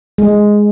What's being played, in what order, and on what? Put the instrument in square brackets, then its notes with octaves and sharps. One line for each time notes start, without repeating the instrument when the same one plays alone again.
[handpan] G#3